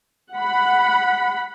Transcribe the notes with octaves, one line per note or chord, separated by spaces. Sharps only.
F#5 B5